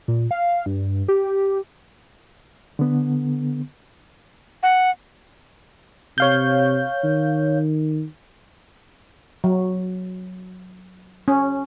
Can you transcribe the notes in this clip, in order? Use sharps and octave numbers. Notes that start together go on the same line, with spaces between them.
A#2
F5
G2
G4
D3 B3
F#5
C3 C#5 F5 G6
D#3
F#3
C#4